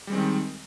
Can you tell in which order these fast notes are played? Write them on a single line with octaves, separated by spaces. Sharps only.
G3 G#3 C4 D#3